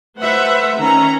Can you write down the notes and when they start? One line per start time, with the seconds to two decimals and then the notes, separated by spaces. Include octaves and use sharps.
0.19 A3 B4 C5 E5 F#5
0.76 D#3 C#4 A#5